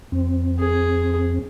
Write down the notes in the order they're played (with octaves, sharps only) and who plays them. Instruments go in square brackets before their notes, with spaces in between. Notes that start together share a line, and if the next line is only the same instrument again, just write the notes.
[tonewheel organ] F2 C4
[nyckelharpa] G#4